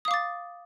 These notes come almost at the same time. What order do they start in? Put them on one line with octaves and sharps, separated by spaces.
D#6 F5 D6 A6